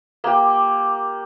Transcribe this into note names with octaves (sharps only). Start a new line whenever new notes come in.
A#3 G4